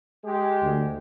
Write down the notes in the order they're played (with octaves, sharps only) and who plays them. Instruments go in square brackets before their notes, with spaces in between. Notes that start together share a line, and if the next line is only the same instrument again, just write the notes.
[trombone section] G#3 G4
[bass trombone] D2